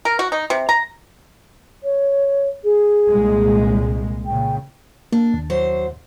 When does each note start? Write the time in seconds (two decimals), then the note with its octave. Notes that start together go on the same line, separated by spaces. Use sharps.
0.05 A#4
0.19 F#4
0.32 D#4
0.50 C3
0.69 A#5
1.83 C#5
2.64 G#4
3.09 C2 A#2 G#3
4.26 A#2 C#3 G5
5.12 A#3 D4
5.34 D#2
5.50 F#2 F#3 C5